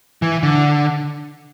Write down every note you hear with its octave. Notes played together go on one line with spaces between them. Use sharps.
E3
D3